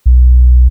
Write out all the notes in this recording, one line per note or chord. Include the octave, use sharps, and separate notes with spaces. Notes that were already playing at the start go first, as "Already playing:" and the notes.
B1